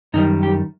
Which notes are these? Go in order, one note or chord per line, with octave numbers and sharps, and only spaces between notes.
F#2 D#3 G3 D#4
G4